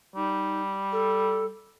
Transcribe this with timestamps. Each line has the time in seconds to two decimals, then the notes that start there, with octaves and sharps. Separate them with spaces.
0.16 G3 D#4
0.92 A4